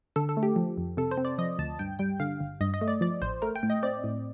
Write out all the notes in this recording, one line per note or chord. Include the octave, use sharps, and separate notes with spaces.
D3 A4
A4
A3
G4
F3
F2
C3 A4
C5
C4
D5
F3 D#5
D2 A5
G2 G5
G3 G5
D3 F5
G1
G2 D#5
D#5
A3
D5
F3 D5
A1 C5
A3 A#4
G5
A2
D#5
C4 D5
A2